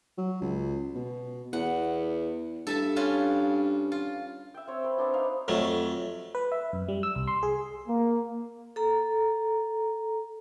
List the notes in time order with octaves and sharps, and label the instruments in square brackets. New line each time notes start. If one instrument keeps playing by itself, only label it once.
[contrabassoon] F#3
C#2
B2
[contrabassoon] E2 [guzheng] F#5
[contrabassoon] G2 [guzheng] A4 E5 A5
[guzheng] C#4 F4 B4
F4
[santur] E5 G5
C4 C#5
B4
B3 C4 D4 F#4
D#4 F5
[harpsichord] F2 F#3 A3
[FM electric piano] B4
E5
F#2
G3
E6
C2
C6
G#4
[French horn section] A#3
[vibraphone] A4 A#5